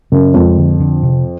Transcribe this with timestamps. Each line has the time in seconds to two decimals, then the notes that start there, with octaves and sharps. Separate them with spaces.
0.12 F#2 C#3
0.34 F2 G#3
0.58 D3
0.80 D3
1.03 C3